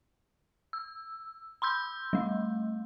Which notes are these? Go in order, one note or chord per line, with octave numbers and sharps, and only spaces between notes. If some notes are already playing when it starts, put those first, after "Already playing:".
E6
B5 C6 E6 G6
G3 A3